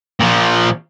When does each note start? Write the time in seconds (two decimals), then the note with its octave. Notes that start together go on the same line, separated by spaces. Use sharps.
0.21 A#2 F3